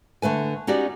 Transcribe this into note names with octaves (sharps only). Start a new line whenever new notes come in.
D3 A3 B4 G#5
C#4 D#4 F#4 G4 D5